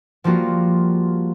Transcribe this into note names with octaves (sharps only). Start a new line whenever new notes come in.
F3 G3 A#3 F4 F#4